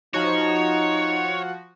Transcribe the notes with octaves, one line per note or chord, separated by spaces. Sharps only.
F3 D#4 F#4 C#5